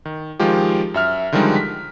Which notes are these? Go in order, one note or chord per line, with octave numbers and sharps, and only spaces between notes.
D#3
D#3 F3 G#3 F4 G4
F#2 E5 F6
D3 D#3 F3 G3 G#3 D#4
B6